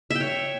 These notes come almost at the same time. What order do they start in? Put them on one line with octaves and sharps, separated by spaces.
E5 G5 C#5